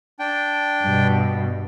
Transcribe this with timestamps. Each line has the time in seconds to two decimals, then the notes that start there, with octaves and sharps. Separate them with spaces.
0.19 D4 G5
0.82 G2 B2